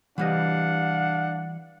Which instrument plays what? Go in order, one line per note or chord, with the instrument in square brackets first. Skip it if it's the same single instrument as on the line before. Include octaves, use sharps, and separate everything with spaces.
[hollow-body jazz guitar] E3 G3 D#5 [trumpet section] D4 F5 F#5